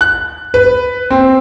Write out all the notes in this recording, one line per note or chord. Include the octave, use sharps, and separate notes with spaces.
F#6
B4
C4